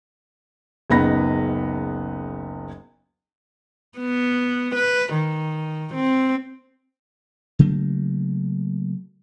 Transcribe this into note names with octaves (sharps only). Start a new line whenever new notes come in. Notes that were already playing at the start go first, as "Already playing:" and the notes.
F#1 C#2 B3 D#4 B5 A#6
B3
B4
D#3
C4
C#3 F#3 A3 A#3